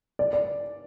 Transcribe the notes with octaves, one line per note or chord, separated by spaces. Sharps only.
D5
D5